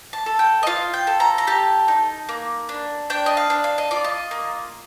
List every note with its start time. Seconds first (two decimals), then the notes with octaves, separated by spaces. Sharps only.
0.13 A5
0.26 A4
0.39 G5
0.63 D#5
0.67 F4 F5
0.94 G5
1.07 A4
1.20 A#5
1.38 A#5
1.47 G4 A5
1.88 D#4
2.29 A#3
2.69 D4
3.10 D4 G5
3.26 D#5
3.37 F5
3.50 D4
3.64 F5
3.78 D#5
3.91 F4 D5
4.04 D#5
4.31 A#3